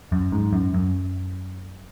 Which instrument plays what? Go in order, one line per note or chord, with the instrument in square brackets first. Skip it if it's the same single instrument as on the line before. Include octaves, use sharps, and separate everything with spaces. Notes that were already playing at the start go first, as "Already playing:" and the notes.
[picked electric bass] F#2
G#2
F#2
F#2